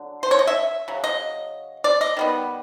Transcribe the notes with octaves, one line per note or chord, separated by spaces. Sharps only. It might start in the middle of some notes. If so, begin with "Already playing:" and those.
Already playing: D3 F#3
C5
C#5
D#5
E5
C#3 F#3
D#5
D5
D#5
D#3 G3 B3